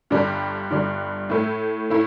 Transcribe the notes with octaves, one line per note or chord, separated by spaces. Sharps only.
G1 G2 D3 G3 D4
G1 G2 D3 G3 D4
A2 A3 E4
A2 A3 E4